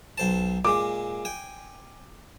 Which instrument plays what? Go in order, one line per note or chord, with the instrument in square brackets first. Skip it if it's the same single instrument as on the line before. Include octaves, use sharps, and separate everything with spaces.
[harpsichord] B1 C5 A5
[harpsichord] A#2 G#3 [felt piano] D6
[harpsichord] G5 G#5